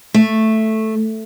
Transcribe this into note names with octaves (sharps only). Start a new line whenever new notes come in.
A3